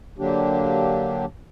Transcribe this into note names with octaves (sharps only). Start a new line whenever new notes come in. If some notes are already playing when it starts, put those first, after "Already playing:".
D3 F#3 A#3 D4 G4